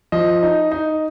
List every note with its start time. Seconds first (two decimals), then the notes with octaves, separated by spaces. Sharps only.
0.12 F3 D#5
0.43 D#4
0.72 D#4